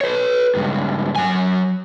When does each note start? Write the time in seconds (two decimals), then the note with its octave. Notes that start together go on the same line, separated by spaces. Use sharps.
0.01 B4 C#5
0.55 C#2 G2
1.16 F#3 G#5